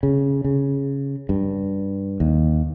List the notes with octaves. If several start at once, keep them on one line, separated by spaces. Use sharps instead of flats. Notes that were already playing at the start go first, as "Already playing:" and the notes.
C#3
C#3
G2
D#2